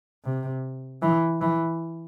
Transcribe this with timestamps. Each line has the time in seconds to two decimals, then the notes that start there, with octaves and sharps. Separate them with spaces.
0.24 C3
1.02 E3
1.41 E3